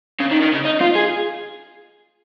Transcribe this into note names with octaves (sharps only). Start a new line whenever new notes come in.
C#3
D#3
D#3
C#3
D#4
F4
G#4